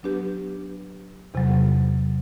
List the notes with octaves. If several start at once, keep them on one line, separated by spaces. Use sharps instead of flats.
F#3 B3 D4 G4 B4
E2 C3 F#3